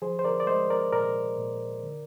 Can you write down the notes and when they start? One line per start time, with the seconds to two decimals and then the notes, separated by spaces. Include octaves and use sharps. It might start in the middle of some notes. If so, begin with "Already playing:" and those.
0.02 F3 G#4 C5
0.19 C5
0.24 A#4 D5
0.40 D5
0.47 G#3 C5 D#5
0.70 A#4 D5
0.92 A#2 A#4 D5
1.38 A#2
1.83 D3